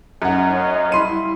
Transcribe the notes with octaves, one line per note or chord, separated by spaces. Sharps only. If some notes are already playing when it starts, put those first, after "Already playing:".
F#2 C#4 D#4 F#5
C#5 D#5 F5
G3 E4 B5 C6 D#7